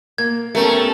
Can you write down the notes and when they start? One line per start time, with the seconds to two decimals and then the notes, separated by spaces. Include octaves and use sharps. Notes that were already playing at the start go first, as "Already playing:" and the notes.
0.18 A#3 G#6
0.55 A3 B3 C#4 G4 A4 A#4